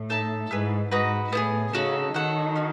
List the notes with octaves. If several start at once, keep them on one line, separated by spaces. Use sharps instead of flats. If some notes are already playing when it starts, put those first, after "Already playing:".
Already playing: A2
D#4 A4 E5 A5
G#2 E4 G#4 B4
G#2 D#4 F#4 B4
A2 B3 E4 G#4
C#3 D#4 F#4 A4
D#3 F#4 A4 C#5 F#5
C#4 F#4